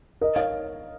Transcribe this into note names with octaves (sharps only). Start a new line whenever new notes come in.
A#4 D#5
C#5 F5